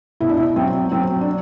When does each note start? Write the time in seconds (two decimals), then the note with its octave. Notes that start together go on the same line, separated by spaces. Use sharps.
0.20 B2 E4
0.29 D4
0.37 E4
0.56 F#3 C4
0.92 F#3 C4
1.21 D4